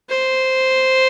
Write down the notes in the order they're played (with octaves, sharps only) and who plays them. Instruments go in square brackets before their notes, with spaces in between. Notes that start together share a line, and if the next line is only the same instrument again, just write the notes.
[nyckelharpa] C5